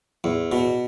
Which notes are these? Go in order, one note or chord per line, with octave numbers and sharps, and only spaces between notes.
E2
B2